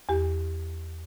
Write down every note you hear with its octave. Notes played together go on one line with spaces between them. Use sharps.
E2 G4